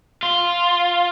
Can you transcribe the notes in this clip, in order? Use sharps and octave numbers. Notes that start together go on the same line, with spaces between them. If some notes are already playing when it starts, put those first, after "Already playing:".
F4